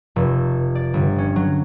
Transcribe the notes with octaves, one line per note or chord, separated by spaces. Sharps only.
F1
D5
G1
C#4
F#3